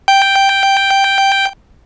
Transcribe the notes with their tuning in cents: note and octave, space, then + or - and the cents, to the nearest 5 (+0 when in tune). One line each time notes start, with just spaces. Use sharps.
G5 +0